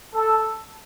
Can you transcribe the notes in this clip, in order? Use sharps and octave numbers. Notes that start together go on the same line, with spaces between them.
A4